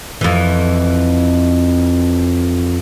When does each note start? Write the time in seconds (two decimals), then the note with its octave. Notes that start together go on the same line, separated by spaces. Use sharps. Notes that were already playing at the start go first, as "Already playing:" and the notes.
0.21 F2 E3